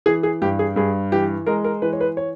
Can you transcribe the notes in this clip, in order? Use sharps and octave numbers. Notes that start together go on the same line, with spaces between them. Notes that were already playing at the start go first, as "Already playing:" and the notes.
E3 G#4
G#4
G2 G4
G#4
G2 G#4
E3 G4
G#3 A#4
A#4
E3 B4
C#5
B4
C#5